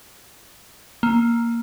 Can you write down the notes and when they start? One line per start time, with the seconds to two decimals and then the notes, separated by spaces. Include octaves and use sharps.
1.03 A#3